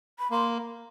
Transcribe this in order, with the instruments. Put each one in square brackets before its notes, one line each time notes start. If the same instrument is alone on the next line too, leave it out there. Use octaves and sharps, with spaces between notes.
[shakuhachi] B5
[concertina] A#3 [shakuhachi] C6